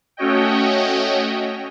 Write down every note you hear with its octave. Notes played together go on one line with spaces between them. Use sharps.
A3 C#4 F#4 C#5 D#5 G5